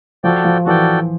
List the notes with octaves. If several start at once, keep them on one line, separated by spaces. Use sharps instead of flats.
F3 F#4 A4 D5 G5
F3
E3 F#4 A4 D5 G5